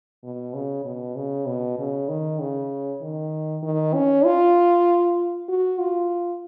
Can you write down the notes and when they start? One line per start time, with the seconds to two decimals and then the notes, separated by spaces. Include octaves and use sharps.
0.24 B2
0.54 C#3
0.85 B2
1.16 C#3
1.47 B2
1.79 C#3
2.09 D#3
2.40 C#3
3.02 D#3
3.63 D#3
3.94 C#4
4.25 F4
5.49 F#4
5.79 F4